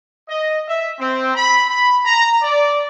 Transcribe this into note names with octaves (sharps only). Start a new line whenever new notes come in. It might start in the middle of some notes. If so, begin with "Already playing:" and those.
D#5
E5
C4
B5
B5
A#5
D5